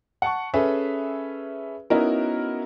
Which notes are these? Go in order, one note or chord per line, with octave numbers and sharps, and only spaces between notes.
F#5 A5 C#6
C#4 G#4 A4 B4 E5
B3 C#4 D#4 E4 F#4 A#4